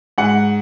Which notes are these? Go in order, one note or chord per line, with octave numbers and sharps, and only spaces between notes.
G#2 F#5